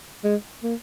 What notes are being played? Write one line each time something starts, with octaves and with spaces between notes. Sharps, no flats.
G#3
A#3